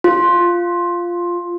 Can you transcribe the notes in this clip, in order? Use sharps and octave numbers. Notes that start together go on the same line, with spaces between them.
F4